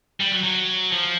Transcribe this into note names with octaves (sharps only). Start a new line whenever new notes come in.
G3
F#3
F#3
F3